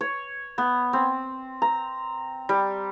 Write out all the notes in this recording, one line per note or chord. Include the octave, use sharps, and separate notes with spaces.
C#5
B3
C4
A#5
G3